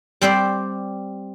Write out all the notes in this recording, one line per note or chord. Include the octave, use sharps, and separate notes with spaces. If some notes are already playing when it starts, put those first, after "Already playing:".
G3 C4 C5 D5